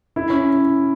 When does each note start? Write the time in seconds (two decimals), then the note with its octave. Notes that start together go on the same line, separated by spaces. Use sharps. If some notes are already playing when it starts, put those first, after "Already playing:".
0.16 E4
0.30 C#4